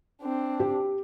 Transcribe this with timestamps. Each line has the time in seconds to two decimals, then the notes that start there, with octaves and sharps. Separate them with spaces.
0.22 C4 D4
0.60 G4